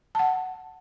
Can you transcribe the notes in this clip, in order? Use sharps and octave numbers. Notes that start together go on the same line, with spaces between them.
F#5 A5